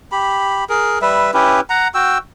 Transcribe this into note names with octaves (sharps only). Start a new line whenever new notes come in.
G4 B5
G#4 A#4
G3 B4 E5
C#4 E4 G4 B4
F#5 A#5
F#4 G5 E6